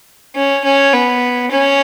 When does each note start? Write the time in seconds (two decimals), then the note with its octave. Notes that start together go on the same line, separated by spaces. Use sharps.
0.36 C#4
0.65 C#4
0.93 B3
1.52 C#4